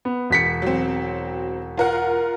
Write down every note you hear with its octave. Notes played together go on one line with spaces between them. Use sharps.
B3
E1 B6 C#7
F#3 C4
F4 A#4 F#5